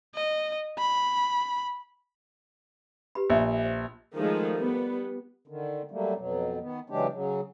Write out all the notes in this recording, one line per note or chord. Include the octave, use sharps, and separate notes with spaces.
D#5
B5
G4 B4 B5
A#1 C5 D#5 E5
C5
D#3 F3 G#3 A3 D#4
G3 B3
D3 D#3
F#3 G3 A3 A#3
F2 B2 F#3
D#3 B3
C#3 E3 F#3 G#3 D4 G4
C#3 F#3